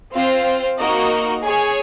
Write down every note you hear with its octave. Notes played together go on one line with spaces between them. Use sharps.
C4 F4 C5 F5
A#3 D#4 F#4 A#4 D#5
G#4 C#5 G#5